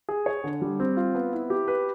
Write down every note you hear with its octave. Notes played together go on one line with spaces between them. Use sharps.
G#4
C#5
D3
G3
C4
F4
B3
E4
G4
B4